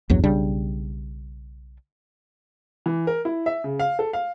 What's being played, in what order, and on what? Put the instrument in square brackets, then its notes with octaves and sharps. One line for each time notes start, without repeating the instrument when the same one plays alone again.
[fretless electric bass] A#1 E2 G2 F#3
B1 C#3 G3 D4
[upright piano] E3
A#4
E4
E5
C#3
F5
A4
F5